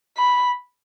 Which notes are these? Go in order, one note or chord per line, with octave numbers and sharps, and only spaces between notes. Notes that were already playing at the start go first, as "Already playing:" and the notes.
B5